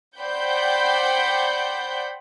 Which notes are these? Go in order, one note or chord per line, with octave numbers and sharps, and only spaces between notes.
C5 D5 F#5 G5 B5 G6